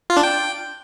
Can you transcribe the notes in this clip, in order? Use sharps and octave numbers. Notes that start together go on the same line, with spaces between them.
F4
D4
G5